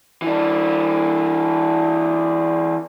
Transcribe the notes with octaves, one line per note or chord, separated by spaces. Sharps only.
E3 D4